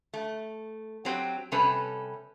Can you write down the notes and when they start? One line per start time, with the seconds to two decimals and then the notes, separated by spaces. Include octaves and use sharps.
0.14 A3
1.05 F#3 C4 G4
1.52 C3 G3 C#4 A4 B4